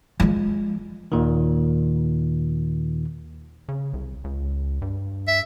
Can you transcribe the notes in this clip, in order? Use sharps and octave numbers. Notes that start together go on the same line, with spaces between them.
F3 G#3
D#2 A#2 D#3
C#3
C2
C#2
G2
E5